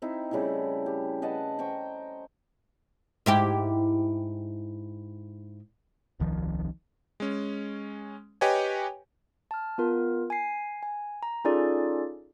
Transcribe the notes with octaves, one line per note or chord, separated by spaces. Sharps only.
C4 D#4 E4
C#3 G3 A3 E4
G4
B4 D#5 F#5 A5
C5 G5 A#5 C#6
G#2 E4 G4
D#1 C2 D#3 F3
G#3 C#4
G4 B4 C#5 D#5 G5 G#5
A5 F6
B3 F4 A#4
G#5 C7
G#5
A#5
C#4 D#4 F4 G#4 A4 D5